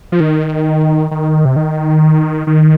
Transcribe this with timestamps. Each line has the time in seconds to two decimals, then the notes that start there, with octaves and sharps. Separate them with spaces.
0.12 F3
0.20 D#3
1.11 D#3
1.45 C3
1.56 D#3
2.47 D#3